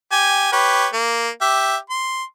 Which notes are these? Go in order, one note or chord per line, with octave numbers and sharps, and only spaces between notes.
G4 G#5
G4 B4 C#5
A#3
G4 E5
C6